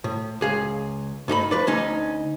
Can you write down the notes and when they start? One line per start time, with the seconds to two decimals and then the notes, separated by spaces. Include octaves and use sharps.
0.04 A2
0.41 C#2 G#4 F5
1.28 G2 D#4 C#5 B5
1.51 F3 B4 D5
1.67 D2 C#4 D#4